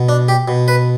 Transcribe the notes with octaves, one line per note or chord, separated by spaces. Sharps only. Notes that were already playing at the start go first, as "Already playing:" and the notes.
Already playing: B2
D4
G4
B2
B4